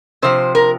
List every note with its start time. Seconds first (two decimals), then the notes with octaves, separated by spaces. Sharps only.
0.22 C3 F3 C5
0.55 A#4